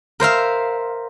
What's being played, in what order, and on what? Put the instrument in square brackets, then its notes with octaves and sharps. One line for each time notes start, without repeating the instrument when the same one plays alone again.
[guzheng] A#4 C5 E5 F5